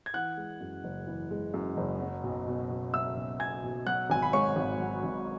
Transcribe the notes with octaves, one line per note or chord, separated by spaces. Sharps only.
G#6
E3 F#5 F#6
G#3
F#2
F#1
E3
G#3
F#2
F#1
F#3
B1
B2
B1
F#3 E5 E6
B1
B2 G#5 G#6
B1
F#3 F#5 F#6
G#1 G#5
B5
G#2 C#5 C#6
G#1
F#3
G#1